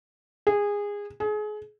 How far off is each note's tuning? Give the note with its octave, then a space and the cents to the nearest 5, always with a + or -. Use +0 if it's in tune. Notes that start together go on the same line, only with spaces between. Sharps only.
G#4 -20
G#4 +30